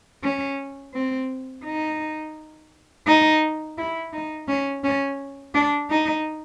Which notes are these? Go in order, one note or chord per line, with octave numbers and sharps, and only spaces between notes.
C#4
C4
D#4
D#4
E4
D#4
C#4
C#4
D4
D#4